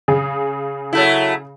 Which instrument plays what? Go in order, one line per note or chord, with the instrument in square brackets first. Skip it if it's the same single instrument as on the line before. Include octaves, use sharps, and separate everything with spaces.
[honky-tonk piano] C#3 G#4
[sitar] F#3 A3 E4